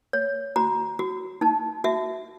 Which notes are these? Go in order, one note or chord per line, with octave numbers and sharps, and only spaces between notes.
C#5
F#4 A#5
F#4
D#4 A5
F#4 E5